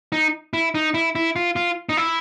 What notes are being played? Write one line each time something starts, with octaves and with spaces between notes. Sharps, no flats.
D#4
E4
D#4
E4
E4
F4
F4
D#4
E4